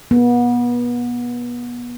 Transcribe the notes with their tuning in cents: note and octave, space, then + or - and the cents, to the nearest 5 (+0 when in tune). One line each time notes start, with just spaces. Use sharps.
B3 -30